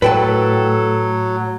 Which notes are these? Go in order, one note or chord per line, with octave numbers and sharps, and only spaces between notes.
A2 F#3 A4 B4 G5 A5